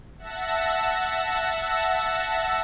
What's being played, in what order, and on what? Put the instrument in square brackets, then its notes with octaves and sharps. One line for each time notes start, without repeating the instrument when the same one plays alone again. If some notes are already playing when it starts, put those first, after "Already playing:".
[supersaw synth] E5 F#5 A5 E6 A#6